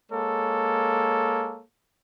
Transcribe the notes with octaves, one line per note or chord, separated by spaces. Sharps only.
G#3 A#3 A4 C#5